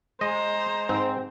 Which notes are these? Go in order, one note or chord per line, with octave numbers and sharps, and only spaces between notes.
G#3 C5 D#5 A#5
G#2 C4